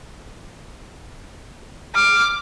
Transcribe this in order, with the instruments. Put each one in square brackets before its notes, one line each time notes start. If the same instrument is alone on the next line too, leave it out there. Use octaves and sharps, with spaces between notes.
[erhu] D6 [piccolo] F6